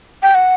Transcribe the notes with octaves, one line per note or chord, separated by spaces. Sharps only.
G5
F#5